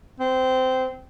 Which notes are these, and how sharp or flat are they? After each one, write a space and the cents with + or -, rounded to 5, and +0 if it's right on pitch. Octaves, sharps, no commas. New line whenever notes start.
C4 -15